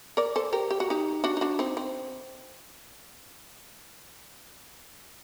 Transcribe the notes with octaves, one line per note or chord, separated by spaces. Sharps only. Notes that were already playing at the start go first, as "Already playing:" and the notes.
A#4 D5
A4 C5
G4 A#4
G4
F#4
D#4 G4
D4 F#4
D#4
D4 F#4
C4 D#4
C4